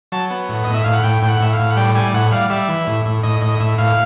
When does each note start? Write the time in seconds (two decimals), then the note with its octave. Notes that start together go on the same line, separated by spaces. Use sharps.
0.12 F#3 A5
0.30 B3
0.49 A2
0.64 A2 D#5
0.74 E5
0.84 A2 F5
0.93 F#5
1.03 A2 G5
1.22 A2 G5
1.28 F#5
1.40 A2 E5
1.53 F5
1.59 A2
1.71 F#5
1.76 G3 G5
1.95 G3 G#5
2.13 A2 F#5
2.31 G3 F5
2.50 G3 E5
2.69 E3
2.87 A2
3.05 A2
3.23 A2 D#5
3.42 A2 D#5
3.60 A2 E5
3.78 A2 F5